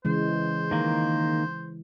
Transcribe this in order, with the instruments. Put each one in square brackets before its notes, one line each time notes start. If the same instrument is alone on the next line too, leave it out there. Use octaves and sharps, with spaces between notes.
[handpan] C#3 E3 G#3 [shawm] C5
[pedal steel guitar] D#3 A#3